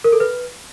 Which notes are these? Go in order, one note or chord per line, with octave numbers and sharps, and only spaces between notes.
A#4
A4
B4